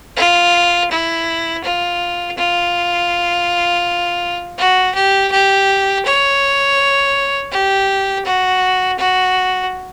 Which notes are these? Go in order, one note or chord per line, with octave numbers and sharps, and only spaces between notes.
F4
E4
F4
F4
F#4
G4
G4
C#5
G4
F#4
F#4